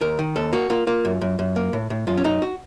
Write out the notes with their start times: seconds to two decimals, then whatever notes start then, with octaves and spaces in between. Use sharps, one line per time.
0.01 D#2 A#4
0.19 D#3
0.36 D#2 A4
0.53 A#3 F#4
0.70 A#3 F4
0.87 A#3 F4
1.05 F#2
1.21 F#2
1.39 F#2
1.56 A#3
1.73 A2
1.90 A2
2.07 F#2 F4
2.17 C#4
2.24 F#2 D#4
2.42 F#4